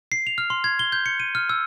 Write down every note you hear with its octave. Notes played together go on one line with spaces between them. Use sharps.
C7
F7
F6
C6
G#6
G7
G6
C#7
D#7
F6
E6